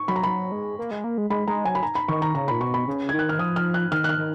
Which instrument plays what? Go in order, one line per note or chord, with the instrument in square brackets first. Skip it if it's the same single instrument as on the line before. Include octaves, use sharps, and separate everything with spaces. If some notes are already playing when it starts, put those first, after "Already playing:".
Already playing: [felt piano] C#6
[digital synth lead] F#3 [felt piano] B5
[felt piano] A#5
[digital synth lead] F#3 [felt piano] B5
[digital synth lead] G#3
A#3
G#3
A#3
G#3
[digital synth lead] G#3 [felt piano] B5
[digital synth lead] G#3 [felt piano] A#5
[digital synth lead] F#3 [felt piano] G#5
[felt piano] B5
A#5
B5
[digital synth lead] D#3 [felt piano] C#6
[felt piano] A#5
[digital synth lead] C#3 [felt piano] A#5
[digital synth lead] A#2 [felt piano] B5
[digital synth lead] B2 [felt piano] C#6
[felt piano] B5
[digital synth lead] C#3
[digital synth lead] D#3 [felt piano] G#6
[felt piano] F#6
F6
[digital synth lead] F3 [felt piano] D#6
[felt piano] F6
F#6
[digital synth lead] D#3 [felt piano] F6
[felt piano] F#6
F6
[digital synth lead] D#3